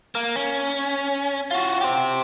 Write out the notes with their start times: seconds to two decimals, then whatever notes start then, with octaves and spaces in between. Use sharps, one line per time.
0.15 A#3
0.36 C#4
1.51 F4 F#4
1.81 G4 C5